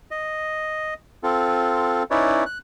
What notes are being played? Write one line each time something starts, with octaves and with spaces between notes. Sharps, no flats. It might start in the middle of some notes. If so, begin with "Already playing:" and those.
D#5
C4 F4 A4
C#4 D#4 E4 B4 C#5 D5
F#6